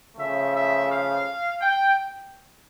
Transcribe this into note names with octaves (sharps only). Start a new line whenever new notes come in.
C#3 F3 A3 E5
E5
F5
G5